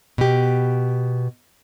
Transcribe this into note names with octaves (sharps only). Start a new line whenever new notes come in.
B2 G4